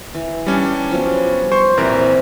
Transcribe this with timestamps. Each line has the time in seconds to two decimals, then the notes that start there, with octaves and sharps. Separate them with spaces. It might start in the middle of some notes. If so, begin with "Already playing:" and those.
0.14 E3
0.46 G3 C#4 D4
0.91 F3 F#3 B3
1.52 C5 C6 C#6
1.77 A#1 C3 E3 A#4